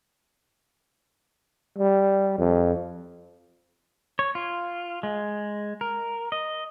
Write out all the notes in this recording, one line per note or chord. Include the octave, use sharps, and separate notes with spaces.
G3
F2
C#5
F4
G#3
A#4
D#5